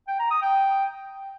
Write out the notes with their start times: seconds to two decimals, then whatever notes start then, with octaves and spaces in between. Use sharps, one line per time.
0.08 G5
0.19 A#5
0.31 D#6
0.42 G5